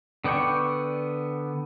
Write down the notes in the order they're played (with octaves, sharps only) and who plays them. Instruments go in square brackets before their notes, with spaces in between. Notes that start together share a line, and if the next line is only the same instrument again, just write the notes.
[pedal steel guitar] D3 B3 D5 G5 C#6